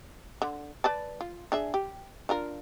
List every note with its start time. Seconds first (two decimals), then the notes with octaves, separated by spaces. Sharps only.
0.42 D3
0.84 B4 D5 A5
1.21 F4
1.52 D4 G#4 E5
1.74 G4
2.29 D4 F4 A#4